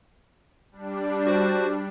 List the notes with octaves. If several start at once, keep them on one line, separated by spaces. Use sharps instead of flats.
G3 D4
F#4 C5 F#6